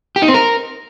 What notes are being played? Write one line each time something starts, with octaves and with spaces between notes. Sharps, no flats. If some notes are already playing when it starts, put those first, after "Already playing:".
G4
D#4
C4
A#4